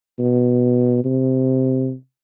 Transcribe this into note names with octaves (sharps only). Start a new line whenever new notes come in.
B2
C3